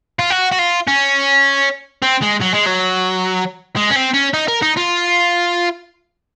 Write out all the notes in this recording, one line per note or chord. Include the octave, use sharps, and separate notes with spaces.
F4
F#4
F#4
F4
C#4
C4
G#3
F#3
G#3
F#3
G#3
C#4
C4
C#4
D#4
A#4
D#4
F4